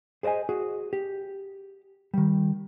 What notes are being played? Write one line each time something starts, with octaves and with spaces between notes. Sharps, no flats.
G#4 C5 D5 D#5 G#5
F#4 G#4
G4
D#3 G3